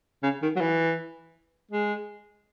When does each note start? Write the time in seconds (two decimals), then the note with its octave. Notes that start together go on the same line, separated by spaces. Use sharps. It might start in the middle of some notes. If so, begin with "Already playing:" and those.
0.23 C#3
0.42 D#3
0.56 F#3
0.61 E3
1.71 G#3